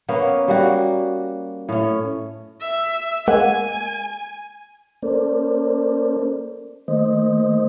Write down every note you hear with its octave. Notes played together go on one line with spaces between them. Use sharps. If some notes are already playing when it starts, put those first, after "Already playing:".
A#3 B3 C#4
G3 A#3 F#4
A2 C#4
E5
G#3 A#3 F#5 G#5
A#3 C#4 A4 A#4 C5 D5
D#3 A3 A#3 C5 D#5